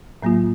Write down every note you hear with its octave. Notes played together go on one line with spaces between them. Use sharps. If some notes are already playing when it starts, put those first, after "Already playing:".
A2 F#3 A#3 F4